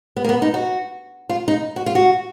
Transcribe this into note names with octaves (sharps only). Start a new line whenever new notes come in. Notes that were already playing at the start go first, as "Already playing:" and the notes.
B3
A#3
B3
D#4
F#4
F4
D#4
F#4
F4
F#4